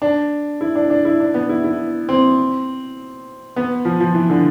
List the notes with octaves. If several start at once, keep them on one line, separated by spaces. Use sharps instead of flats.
D4
E4
D4
D4
E4
D4
B3
E4
E4
C4
B3
F3
F3
E3
D3